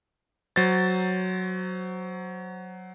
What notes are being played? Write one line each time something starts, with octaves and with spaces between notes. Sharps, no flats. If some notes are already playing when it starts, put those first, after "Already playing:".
F#3 C5 A6